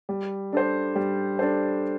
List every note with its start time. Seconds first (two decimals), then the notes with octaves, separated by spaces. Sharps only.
0.09 G3
0.53 D4 A4 C5
0.95 G3
1.39 D4 A4 C5